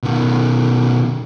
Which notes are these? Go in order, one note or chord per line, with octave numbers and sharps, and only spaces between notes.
B2 D#3